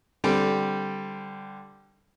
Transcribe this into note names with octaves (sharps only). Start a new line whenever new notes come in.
D3 G3 C4